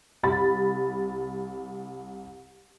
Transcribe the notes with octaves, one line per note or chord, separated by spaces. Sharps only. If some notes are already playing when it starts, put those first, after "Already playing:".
C2 B5 A6